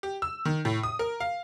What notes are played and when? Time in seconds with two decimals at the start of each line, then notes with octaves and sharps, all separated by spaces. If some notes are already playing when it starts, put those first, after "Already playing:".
0.03 G4
0.22 E6
0.45 D#3
0.65 A2
0.83 D#6
0.99 A#4
1.20 F5